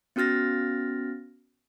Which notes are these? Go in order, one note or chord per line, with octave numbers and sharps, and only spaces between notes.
B3 C#4 F#4 F6 A6 A#6